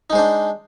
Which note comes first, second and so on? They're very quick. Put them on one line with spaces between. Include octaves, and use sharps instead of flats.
D#4 G#3 C5 D4